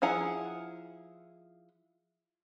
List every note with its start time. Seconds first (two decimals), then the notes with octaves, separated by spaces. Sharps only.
0.02 F3 E4 G#4 F#5 A#5